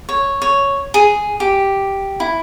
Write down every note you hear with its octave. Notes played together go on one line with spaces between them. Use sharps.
C#5
C#5
G#4
G4
E4